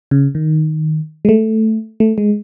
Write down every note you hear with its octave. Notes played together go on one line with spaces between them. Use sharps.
C#3
D#3
G#3
A3
A3
G#3